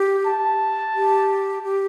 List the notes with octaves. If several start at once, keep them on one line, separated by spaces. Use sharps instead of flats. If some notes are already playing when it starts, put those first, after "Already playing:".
Already playing: G4
A5
G4
G4